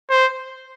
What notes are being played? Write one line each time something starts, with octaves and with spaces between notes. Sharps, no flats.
C5